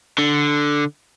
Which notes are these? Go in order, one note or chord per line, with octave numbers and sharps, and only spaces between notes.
D3